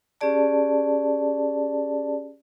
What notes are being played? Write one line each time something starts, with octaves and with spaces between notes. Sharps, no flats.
C#4 G4 G#4 D5 A5